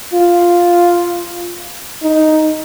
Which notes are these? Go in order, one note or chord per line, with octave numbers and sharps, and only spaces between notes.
F4
D#4